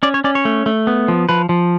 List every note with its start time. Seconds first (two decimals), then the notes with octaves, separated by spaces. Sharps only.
0.03 C#4 D5
0.14 C#5
0.24 C#4 D5
0.35 C#5
0.45 A3
0.66 A3
0.87 B3
1.08 F3
1.29 F3 B4
1.49 F3